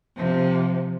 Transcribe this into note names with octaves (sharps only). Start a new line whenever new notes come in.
C3 F3